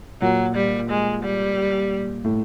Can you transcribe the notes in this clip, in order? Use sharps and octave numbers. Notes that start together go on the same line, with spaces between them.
A#2 F#3
G3
G#3
G3
A2